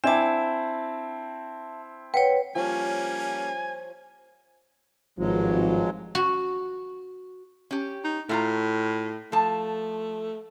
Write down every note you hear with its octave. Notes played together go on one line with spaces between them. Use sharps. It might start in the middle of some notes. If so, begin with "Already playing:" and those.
C4 D4 E4 D5 E5 A5 D6
B4 C#5 F#5 G5
F3 G3 A#3 C#4 C#5 G#5
G#1 G2 F3 F#3 G#3
F#4
C#4 G4
D#4
A2 A3 F4 A#5
F3 A3 A5